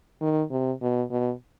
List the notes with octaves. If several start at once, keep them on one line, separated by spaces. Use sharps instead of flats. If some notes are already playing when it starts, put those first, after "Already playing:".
D#3
C3
B2
B2